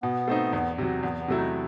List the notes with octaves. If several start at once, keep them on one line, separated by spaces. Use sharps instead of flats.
B2 B3
A3 C4 D#4
E2
C3 F#3
E2 B3
B3
C3 F#3 A3 E4
D#4